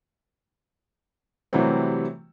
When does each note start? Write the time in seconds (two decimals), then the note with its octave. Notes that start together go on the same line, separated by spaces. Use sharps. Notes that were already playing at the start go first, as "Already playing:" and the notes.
1.53 C3 E3 F#3 G3 A3 C4